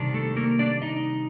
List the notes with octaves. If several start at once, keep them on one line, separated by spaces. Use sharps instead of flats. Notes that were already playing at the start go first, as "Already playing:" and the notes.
Already playing: C3 D#3 G3 D4
A3 A4
A#3 A#4
D4 D5
D#4 D#5